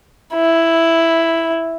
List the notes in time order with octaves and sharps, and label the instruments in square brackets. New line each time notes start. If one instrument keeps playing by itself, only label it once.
[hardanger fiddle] E4